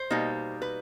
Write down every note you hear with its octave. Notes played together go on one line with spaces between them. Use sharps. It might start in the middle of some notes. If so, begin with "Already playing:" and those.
Already playing: C5
B2 G3 A#3 D#4
B4